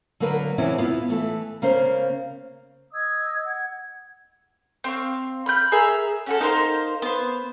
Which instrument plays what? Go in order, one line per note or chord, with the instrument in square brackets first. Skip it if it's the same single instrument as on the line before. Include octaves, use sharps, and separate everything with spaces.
[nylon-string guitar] D3 F#3 A#3 A#4 B4
E2 C3 E3 C4 C#4 E4
B3 E4 F4
E3 A3 A4
C#3 A#3 C#4 C5
[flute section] D#5 D#6 E6 G#6
F#5 G#6
[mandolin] C4 F5 C#6
B5 F6 G6
G#4 A#4 E5 A#5
C#4 F#4 A4
D#4 A#4 C5 F5
B3 C5